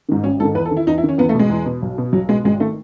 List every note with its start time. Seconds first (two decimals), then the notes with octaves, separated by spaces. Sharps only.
0.09 G#2 D#3
0.24 G#1 C#4
0.40 G#2 D#3 A4
0.55 E2 B4
0.66 A4
0.71 D#3
0.77 E4
0.87 E2 D#4
0.98 E4
1.03 D#3
1.09 C#4
1.18 E2 B3
1.29 A3
1.34 B2
1.39 G#3
1.50 E2
1.66 B2
1.82 B1
1.98 B2
2.13 B1 F#3
2.29 B2 G#3
2.44 G#1 G#3
2.60 D#3 A3